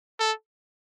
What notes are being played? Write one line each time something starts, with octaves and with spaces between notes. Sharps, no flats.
A4